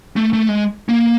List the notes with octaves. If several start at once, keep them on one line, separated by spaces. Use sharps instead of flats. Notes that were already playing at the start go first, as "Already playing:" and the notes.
A3
A3
G#3
A#3